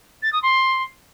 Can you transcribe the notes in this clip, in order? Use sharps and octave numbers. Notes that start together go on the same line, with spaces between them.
A6
D#6
C6